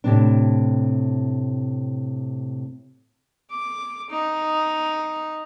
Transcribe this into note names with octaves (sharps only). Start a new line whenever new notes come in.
A2 C3 D4
D6
D#4